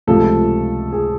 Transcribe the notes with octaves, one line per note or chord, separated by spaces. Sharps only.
C#2 C3 F3 A3 A4
G#4